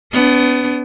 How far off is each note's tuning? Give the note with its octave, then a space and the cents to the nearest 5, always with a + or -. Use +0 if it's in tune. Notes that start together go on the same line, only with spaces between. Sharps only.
B3 +20 D4 -35